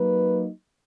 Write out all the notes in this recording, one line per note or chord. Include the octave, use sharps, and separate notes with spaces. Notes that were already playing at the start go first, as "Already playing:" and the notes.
Already playing: F#3 A#3 D#4 B4